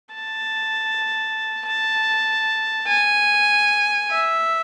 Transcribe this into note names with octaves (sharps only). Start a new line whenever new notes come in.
A5
A5
G#5
E5